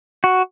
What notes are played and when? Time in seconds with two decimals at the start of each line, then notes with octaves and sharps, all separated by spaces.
0.24 F#4